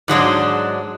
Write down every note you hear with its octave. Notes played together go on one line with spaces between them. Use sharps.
G#2 F#3 G#3 D4